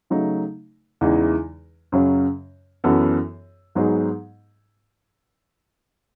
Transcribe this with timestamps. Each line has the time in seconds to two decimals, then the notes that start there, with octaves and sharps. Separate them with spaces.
0.10 C#3 F#3 A3 D#4
1.01 E2 C#3 E3 G#3 D#4
1.92 F#2 C#3 F#3 C#4
2.84 F#2 E3 B3 F#4 A4
3.75 G#2 F#3 B3 D#4 G#4